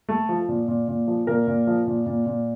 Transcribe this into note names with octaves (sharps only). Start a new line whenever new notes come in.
A3
F3
A#2
A#2
A#2
F3
A#2 A#4
A#2
F3
A#2
A#2
A#2